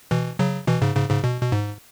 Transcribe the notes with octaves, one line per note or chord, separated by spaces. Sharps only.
B2 E3
C#3 F#3
B2 E3
G#2 C#3
G#2 C#3
G#2 C#3
B2
B2
G#2